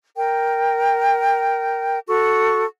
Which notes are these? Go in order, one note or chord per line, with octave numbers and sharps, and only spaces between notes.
A#4 G5
F#4 A4 C#6